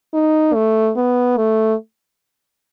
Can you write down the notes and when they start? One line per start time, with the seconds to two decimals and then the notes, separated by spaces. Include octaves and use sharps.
0.14 D#4
0.54 A3
0.97 B3
1.37 A3